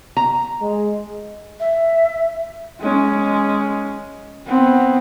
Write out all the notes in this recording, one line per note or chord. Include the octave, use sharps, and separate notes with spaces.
A#5
G#3
E5
G#3 C#4
B3 C4